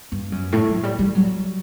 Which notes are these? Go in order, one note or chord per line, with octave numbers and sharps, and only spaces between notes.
G2
F#2
A2
F#3
G3
G3
F#3